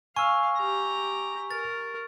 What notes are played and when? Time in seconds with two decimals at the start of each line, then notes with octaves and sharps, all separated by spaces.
0.16 F5 G#5 C#6 E6
0.58 G4 A#5
1.51 A#4 A6